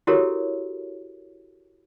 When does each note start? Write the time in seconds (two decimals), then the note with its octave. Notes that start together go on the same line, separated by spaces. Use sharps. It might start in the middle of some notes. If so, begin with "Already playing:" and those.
0.07 E4 F#4 G4 A4 A#4 C#5